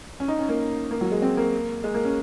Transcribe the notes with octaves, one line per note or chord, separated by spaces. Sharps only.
C#4
D#4
C#4
A#3
A#3
F#3
G#3
C4
A#3
G#3
A#3
C#4